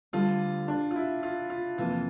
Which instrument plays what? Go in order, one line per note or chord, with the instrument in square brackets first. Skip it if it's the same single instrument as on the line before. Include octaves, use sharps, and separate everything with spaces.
[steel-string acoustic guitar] D2 D3 G3 [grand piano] F4
[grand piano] D4
F4
E4
F4
F4
[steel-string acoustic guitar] F2 C3 E3 A#3 [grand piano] F4